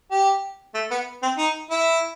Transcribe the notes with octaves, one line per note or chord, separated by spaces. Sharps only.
G4
A3
B3
C4
D#4
E4